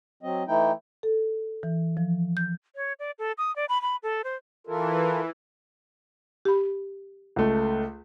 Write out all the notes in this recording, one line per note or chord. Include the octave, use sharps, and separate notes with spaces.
F#3 C4 D#5
E3 A3 D#4 E4 G5
A4
E3
F3
G6
C#5
D5
A4
D#6
D5
B5
B5
A4
C5
E3 F4 A4 A#4
G4 B5
C#2 A3